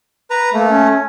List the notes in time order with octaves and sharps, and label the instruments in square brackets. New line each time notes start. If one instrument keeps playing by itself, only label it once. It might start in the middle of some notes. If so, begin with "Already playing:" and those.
[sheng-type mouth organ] B4 A#5
[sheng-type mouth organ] A3 [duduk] A#3
[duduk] C#4